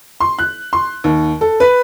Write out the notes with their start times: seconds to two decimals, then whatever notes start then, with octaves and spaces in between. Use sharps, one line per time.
0.20 C6
0.39 F#6
0.73 C6
1.04 D#2
1.41 A4
1.60 B4